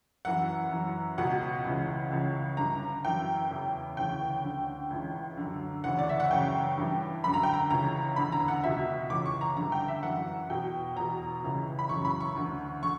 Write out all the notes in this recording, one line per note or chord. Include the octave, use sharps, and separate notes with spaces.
F#2 E3 F#5
F#2 E3
C#2 B2 F#5
C#2 C#3 E3
C#2 C#3 E3
G2 D3 A#5
F#2 E3 G5
E2 C#3 E3
D2 C#3 E3 G5
D2 D3
C#2 C#3 E3
F#2 D3
D2 C#3 E3 F#5
D5
E5
F#5
F#2 C#3 E3 G5
G2 E3
F#2 D3 B5
A#5
G5
A#5
C#2 C#3 E3 A#5
E2 D3 B5
A#5
F#5
C#2 B2 E5
C#2 C#3 E3 D6
C#6
A#5
G2 D3 A#5
G5
E5
F#2 E3 F#5
E2 B2 G5
E2 B2 A#5
C#2 C#3 E3
B5
F#2 C#3 E3 C#6
B5
C#6
D2 D3
D3 C#6